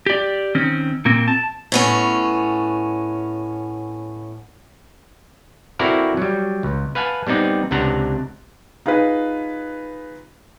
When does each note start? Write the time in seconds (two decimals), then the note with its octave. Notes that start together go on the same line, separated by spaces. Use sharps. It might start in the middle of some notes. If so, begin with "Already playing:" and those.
0.06 G4 D5
0.55 D#3 C4 C#4
1.05 A#2 A#3 C4
1.28 A5
1.72 A2 B3 C#4
5.79 C4 E4 F#4 A4 A#4 D5
6.17 F#3 G3
6.63 C#2
6.95 B4 F5 F#5 G#5 A5
7.27 G3 B3 C4 D#4 D5
7.71 C#2 C3 D4 F#5 A#5
8.86 D#4 F4 G#4 B4